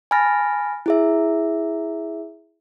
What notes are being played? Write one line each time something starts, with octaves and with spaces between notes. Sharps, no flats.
G#5 A5 B5 F6 A6 A#6
E4 G#4 E5